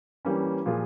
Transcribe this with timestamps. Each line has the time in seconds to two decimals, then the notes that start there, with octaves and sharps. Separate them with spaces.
0.25 E3 G3 A#3 C#4
0.66 A#2 F3 A#3 F4 G#4